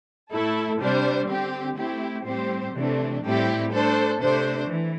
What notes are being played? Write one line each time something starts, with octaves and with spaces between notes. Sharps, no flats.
A2 A3 E4 A4
C3 G3 D4 C5
D3 C4 G4
A3 C4 E4 G4
A2 G3 C4 G4 C5
C3 E3 A3 D4
A2 G3 C4 E4 G4
A3 D4 A4 C5
C3 A3 D4 C5
E3